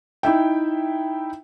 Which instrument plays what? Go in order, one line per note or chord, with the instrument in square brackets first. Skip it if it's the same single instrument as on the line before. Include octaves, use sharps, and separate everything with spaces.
[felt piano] D#4 E4 E5 G5